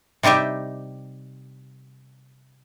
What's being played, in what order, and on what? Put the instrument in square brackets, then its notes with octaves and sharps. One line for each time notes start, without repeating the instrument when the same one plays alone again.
[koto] C3 G3 D#4 G4 E5